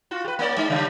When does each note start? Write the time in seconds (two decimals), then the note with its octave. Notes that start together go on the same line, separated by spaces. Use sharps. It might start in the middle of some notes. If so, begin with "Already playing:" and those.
0.11 F4 F#4
0.25 G4 B4
0.39 A#3 C#4 D5
0.57 G#3 D#4
0.70 C#3 G3 D4